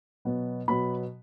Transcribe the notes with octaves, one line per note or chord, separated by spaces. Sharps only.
B2 F#3 B3
B2 F#3 B3 B5